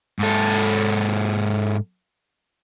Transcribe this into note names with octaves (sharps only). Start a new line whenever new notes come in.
G#2 A4